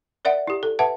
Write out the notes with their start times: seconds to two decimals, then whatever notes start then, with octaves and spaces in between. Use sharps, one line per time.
0.25 A#4 D5 E5 F#5
0.47 E4 G4
0.63 A4
0.79 B4 E5 F#5 A5